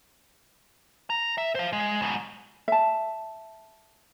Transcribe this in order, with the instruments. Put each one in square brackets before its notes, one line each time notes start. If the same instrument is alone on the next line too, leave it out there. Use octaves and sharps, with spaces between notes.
[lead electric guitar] A#5
E5
C5 F5
G#3
G#2 B2
[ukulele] E5 A5